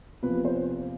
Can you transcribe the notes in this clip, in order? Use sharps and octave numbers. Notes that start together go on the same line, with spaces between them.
E2 C3 F3 A#3 B4
C5